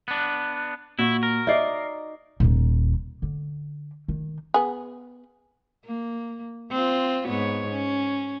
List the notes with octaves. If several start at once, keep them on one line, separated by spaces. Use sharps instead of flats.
B3 D4
A#2 E4 F#4
A#4
D#4 D5 E5 C7
D#1 D#4
D3
D#3
B3 G#4
A#3
C4 F4
G#2 B3 C#5
C#4